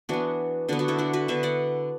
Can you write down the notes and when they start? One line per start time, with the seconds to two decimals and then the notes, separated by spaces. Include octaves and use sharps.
0.09 E3 B3 D4 F#4
0.68 D3 B3 D4 F#4
0.79 D4 F#4
0.88 E4 A4
0.98 D4 F#4
1.13 F#4 B4
1.28 D3 B3 B4 E5
1.43 D5 F#5